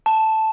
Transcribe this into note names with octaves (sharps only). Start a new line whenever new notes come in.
A5